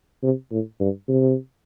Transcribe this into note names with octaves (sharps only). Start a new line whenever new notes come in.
C3
A2
G2
C3